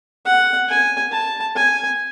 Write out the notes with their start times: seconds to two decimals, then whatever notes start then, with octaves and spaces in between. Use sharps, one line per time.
0.25 F#5
0.69 G#5
1.12 A5
1.56 G#5